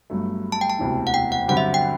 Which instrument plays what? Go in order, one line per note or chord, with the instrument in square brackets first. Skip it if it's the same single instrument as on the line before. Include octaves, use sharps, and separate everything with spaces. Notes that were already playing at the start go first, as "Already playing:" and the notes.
[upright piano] G1 G2 F#3 A3
[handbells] A5
G5
A5
[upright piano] E1 D2 C3 E3
[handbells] F#5
G5
F#5
[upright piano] G2 D3 F#3 C4 G4 [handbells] F#5
[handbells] E5
G5